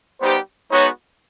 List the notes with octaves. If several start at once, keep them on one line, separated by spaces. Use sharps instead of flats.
G3 B3 D#4 G4 C5
G#3 B3 D#4 F#4 C#5